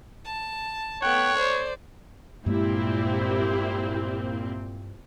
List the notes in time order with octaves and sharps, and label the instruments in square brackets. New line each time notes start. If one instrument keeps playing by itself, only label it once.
[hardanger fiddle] A5
[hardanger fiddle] A3 B3 [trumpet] C#5 [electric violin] G5 F#6
[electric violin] C5 [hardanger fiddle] D5
[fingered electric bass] G2 G#3 A#3 [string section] A#2 C4 [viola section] E4 G4